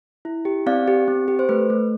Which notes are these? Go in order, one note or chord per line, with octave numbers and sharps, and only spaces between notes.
E4
G4
C4 D5 F5
G4
C4
G4
C5
A3 B4
A3